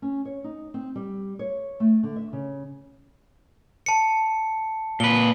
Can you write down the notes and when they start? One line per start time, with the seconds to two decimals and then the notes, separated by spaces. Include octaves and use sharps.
0.02 C#4
0.25 C#5
0.44 D#4
0.74 C4
0.96 G3
1.39 C#5
1.80 A3
2.03 D3
2.16 E5
2.33 C#3
3.86 A5 C#7
5.00 A#2 B4 G7